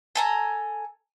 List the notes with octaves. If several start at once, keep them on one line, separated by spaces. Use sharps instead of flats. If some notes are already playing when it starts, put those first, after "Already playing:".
A4 G#5 A#5